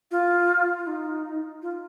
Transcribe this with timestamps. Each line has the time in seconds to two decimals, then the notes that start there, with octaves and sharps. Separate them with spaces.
0.11 F4
0.78 F4
0.87 D#4
1.62 F4